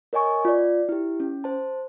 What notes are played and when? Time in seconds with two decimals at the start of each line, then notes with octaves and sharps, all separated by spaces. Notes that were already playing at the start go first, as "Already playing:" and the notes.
0.13 A#4 C#5 D#5 G#5 C#6
0.45 F4 D5
0.89 E4 G4
1.20 C#4
1.44 C5 A5